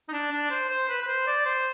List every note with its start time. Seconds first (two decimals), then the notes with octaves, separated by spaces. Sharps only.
0.09 D#4
0.13 D4
0.32 D4
0.51 C5
0.69 C5
0.89 B4
1.02 B4
1.07 C5
1.27 D5
1.46 C5